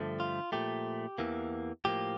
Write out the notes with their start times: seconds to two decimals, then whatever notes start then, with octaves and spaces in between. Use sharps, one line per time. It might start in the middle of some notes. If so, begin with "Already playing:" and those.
Already playing: G2 D3 F3 A3
0.20 F4
0.52 A#2 F3 A3 G4
1.18 E2 E3 A#3
1.85 A2 F3 A#3 G4